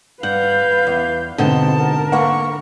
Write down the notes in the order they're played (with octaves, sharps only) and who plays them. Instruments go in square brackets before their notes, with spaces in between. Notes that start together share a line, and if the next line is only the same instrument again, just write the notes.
[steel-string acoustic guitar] G2 [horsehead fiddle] B4 F5 [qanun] F#5 [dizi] G6
[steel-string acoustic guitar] E2
[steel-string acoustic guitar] G#2 B2 B3 [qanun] D3 G5 [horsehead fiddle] C4 [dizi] A5
[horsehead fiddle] A#4
[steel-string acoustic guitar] A#3 B4 F#5 [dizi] C#6